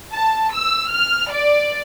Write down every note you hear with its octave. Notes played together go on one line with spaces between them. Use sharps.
A5
E6
F6
D5